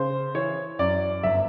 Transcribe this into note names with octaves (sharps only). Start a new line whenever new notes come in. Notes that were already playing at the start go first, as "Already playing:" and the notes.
Already playing: C#3 C5
E3 C#5
F#2 D5
G1 E5